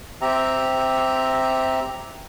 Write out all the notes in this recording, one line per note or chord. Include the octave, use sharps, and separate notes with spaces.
C4 G4 E5 A#5